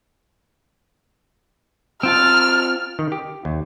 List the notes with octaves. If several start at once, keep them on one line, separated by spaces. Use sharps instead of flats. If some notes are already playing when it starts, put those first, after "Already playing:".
C4 F4 A5 F6
D#3
G4
D#2